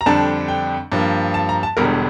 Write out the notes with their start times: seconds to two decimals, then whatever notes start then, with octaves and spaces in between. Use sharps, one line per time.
0.01 A#5
0.06 F2 D3 G3 D4 A5
0.48 G5
0.92 G2 F3 A#3
1.34 A5
1.49 A#5
1.63 A5
1.77 E1 E2 D3 G3 A#4